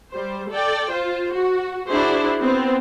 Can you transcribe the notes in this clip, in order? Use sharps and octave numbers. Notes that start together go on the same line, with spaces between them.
G3 C5
A4 D5 G5
F4 C5
F#4
D4 E4 F#4 G#4 C5
B3 C4